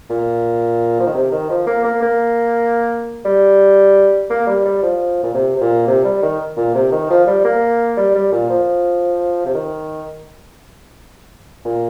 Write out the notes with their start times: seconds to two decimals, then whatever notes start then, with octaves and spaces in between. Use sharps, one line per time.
0.10 A#2
1.00 F3
1.07 D#3
1.14 C3
1.32 D#3
1.50 F3
1.67 A#3
1.84 A#3
2.03 A#3
3.25 G3
4.30 A#3
4.47 G3
4.65 G3
4.83 F3
5.23 A#2
5.34 C3
5.57 C3
5.61 A#2
5.87 C3
6.04 G3
6.22 D#3
6.57 A#2
6.75 C3
6.92 D#3
7.10 F3
7.27 G3
7.44 A#3
7.97 G3
8.15 G3
8.32 A#2
8.50 F3
9.46 C3
9.55 D#3
11.65 A#2